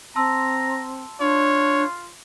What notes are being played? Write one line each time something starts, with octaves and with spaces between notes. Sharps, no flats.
C4 A5 A#5 C6 E6
D4 F4 C#5